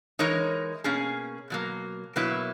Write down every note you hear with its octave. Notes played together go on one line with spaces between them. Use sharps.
E3 G#3 D#4 A#4 C#5
B2 A#3 C#4 G#4
B2 F#3 A#3
B2 F#3 A#3 E4 B4